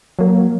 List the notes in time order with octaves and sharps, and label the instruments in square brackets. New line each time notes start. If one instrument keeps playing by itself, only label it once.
[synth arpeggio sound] F#3 A#3